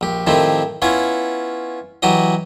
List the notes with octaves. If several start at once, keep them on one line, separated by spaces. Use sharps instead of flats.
A#1 G4
A2 D#3 F3 C4 E4 G4
B3 C#4 E4 F4 C#5
E3 F#3 F#4 G4 D#5